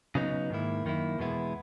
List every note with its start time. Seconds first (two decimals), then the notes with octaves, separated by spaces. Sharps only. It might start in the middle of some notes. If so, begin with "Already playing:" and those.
0.15 C#3 F#3 B3 D#4
0.50 G#2 D#3 A#3 E4
0.85 F#2 D#3 A#3 E4
1.18 E2 B2 G#3 B3 E4